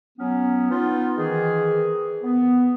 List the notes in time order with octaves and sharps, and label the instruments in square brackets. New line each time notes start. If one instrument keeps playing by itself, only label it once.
[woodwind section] F#3 B3 C#4
B3 D#4 F4
D#3 E3 G#4
B3